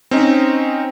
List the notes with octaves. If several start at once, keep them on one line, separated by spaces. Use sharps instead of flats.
C4 C#4 D#4